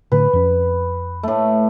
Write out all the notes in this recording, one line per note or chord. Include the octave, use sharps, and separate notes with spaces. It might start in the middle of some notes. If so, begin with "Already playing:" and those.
A2 D3 B4
F2 C#4
A2 A3